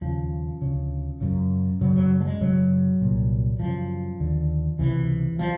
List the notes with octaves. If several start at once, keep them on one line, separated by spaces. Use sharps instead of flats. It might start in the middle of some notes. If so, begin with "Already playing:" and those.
D#2 C#3 F3
D2 C#3
F#2 C#3
F#2 C#3 F#3
F#3
A3
G#3
F#2 C#3 F#3
C2 A#2
F#2 C#3 F3
D#2 D3
C#2 C3 E3
B2 F3